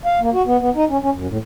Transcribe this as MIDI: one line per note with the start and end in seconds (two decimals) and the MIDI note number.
0.05 0.19 77
0.21 0.30 58
0.33 0.42 66
0.46 0.57 59
0.60 0.70 59
0.75 0.85 63
0.90 0.97 61
1.02 1.10 61
1.15 1.27 42
1.28 1.38 45